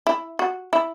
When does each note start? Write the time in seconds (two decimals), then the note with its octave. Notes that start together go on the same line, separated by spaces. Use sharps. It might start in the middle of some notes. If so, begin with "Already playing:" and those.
0.07 E4
0.39 F#4
0.73 E4